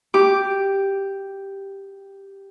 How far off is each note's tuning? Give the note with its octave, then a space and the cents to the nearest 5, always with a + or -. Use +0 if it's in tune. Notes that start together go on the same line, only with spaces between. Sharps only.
G4 +0 D6 +0